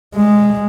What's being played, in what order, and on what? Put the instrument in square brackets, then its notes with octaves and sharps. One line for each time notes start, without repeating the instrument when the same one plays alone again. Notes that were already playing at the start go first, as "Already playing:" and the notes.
[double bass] G#3